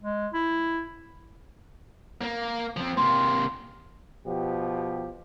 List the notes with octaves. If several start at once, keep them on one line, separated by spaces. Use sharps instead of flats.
G#3
E4
A#3
F3 C4
C3 A#3 C6
B2 F3 G4